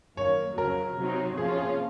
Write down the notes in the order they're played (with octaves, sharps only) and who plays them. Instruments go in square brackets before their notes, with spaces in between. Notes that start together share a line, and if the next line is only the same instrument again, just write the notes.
[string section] F#2 D#3 A#3 [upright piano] C#5
[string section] F2 C#3 F#3 [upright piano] A#4
[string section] C3 F#3 C4 D#4
[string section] C3 F3 A#3 C#4 F4 [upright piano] G#4
[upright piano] G#4